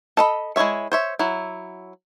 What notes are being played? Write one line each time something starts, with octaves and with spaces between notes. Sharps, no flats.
A4 D#5 B5
G#3 E4 G#4 C#5 E5
C5 C#5 E5
F#3 E4